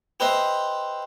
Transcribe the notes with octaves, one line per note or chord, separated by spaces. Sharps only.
G4 B4 C5 D#5 E5 C6